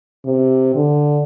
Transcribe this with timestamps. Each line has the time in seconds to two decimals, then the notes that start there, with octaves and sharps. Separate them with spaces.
0.25 C3
0.75 D3